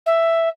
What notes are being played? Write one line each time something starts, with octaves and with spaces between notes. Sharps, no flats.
E5